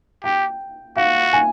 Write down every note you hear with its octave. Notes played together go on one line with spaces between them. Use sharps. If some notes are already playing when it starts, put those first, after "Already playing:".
G4 G5
F#4 F5
G#5